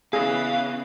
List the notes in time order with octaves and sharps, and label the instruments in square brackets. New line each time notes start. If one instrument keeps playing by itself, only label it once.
[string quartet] C#3 E3 [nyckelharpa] B3 [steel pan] G#4 [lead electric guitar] F5